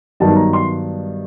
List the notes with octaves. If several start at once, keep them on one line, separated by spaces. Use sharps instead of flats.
G2 D#3 F#3 B3 A5
A#5
C6